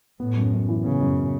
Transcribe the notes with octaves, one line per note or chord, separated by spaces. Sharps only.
A2 B3
F#2
F#2
E3
C#3 B3
F#2